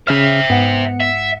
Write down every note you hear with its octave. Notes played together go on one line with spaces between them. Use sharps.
C#3 C5 E5 F6
G#2 B3 F#5 C#7
E5